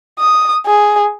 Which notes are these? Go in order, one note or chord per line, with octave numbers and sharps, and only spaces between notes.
D#6
G#4